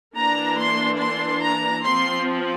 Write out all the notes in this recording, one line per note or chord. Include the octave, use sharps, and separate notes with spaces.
E3 A#3 D4 A#5
C6
C6
A#5
F3 C4 C6